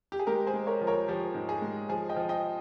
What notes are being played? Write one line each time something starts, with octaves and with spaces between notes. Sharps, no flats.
G4
G#4
G#3 G4 A#4
G#4 C5
G#3
A#4 C#5
F3
A#4 C#5
F3 G4
G#2
G#4
G#3
F3 G#4
D#5 G5
F3
D#5 G5